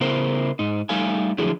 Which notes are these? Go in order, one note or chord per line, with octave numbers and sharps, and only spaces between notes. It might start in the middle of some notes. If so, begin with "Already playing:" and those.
C#3 B3 E4 A#4 C5
G#2 D#4
G3 A3 D#4 A4 F5 G#5
D3 F3 F#3 A3 E4 G#4